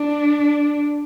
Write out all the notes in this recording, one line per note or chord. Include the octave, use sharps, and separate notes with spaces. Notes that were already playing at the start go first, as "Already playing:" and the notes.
Already playing: D4